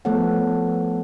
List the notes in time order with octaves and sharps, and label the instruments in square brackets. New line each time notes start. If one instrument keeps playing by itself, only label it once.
[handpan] F3 A3 B3 A4 C#5 F#5